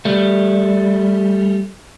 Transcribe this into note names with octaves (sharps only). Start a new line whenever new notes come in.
G3 A3